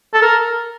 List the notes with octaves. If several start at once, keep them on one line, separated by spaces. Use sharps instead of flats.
A4
A#4